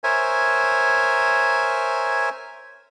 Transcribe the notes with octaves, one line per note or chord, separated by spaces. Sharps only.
A#4 C5 C#5 E5 G#5